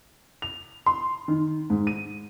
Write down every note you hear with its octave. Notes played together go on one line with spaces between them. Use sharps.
F7
C6
D#3
G#2
D#7